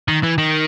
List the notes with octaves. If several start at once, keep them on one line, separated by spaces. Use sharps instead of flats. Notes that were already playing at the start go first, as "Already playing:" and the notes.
D#3
E3
D#3